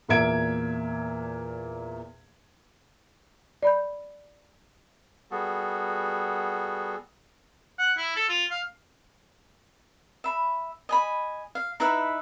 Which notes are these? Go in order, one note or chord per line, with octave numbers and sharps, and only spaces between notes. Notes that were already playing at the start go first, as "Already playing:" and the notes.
E2 A#2 A#3 E5 G#6 D7
D5 B5 G6
G3 B3 F#4 G#4 A4
F#5
E4
A4
F4
F5
E5 B5
D#5 G#5 B5
F5
D#4 E4 B4 E5